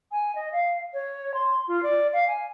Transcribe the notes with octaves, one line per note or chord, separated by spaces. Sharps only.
G#5
D#5
F5
C#5
C6
F4
D5
F5
G#5